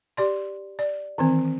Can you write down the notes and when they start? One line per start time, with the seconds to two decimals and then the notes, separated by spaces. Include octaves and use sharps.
0.17 G4 D5 C6
0.79 D5
1.18 D#3 E3 C4